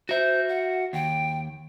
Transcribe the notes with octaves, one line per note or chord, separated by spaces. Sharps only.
F#4 C5 E5
F#5
D#2 G5